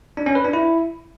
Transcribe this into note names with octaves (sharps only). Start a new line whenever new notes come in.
D4
C#4
B4
D4
E4